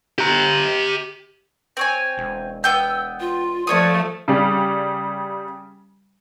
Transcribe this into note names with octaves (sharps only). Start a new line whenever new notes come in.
G4 A#5
C4 C#5 G#5
E1
B3 G5 E6 G6
F4
F3 A3 F4 C#5 D5 D#6
C#3 G3